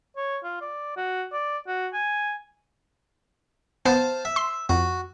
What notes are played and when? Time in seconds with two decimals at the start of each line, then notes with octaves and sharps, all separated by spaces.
0.17 C#5
0.44 F4
0.61 D5
0.97 F#4
1.33 D5
1.68 F#4
1.93 G#5
3.85 B3 C5 F5 A5
4.25 E5
4.36 C6
4.69 F2 F#4